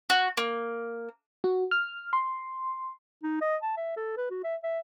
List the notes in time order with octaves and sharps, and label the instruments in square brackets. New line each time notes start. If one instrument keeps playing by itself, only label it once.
[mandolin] F#4
A#3
[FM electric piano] F#4
F6
C6
[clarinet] D#4
D#5
A5
E5
A4
B4
F#4
E5
E5